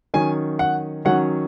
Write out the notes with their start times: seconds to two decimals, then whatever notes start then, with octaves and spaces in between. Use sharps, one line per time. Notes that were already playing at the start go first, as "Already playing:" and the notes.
0.14 D#3 F#3 C#4 G#5
0.59 F#5
1.05 D#3 F#3 C#4 F#5